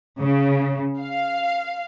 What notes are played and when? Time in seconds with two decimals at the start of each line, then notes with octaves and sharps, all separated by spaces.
0.20 C#3
1.00 F5